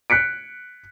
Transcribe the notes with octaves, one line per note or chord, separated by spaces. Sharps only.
F#6 B6 C#7 D7